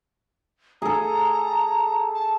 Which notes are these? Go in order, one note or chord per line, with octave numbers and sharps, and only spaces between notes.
G#4 A4 A#5
A5